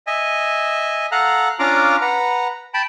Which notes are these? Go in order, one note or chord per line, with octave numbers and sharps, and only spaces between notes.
D#5 E5 G#5
A4 F5 F#5 A#5 F#6
C#4 D4 F4 F5 A#5 D6
B4 F#5 A#5
G5 A5 B5